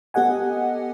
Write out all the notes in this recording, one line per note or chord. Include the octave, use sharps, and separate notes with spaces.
B3 G4 A4 D#5 F#5 G#5